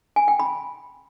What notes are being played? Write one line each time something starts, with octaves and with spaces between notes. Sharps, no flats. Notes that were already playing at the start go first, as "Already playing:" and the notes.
G#5
G5
B5